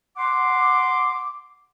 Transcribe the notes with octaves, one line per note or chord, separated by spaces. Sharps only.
F#5 C6 D6